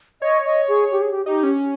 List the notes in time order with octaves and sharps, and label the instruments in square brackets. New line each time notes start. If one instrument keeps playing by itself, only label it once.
[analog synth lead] C#5 [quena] D#5
[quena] D#5
G#4
G4
G#4
G4
[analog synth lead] D#4 [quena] G4
[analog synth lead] C#4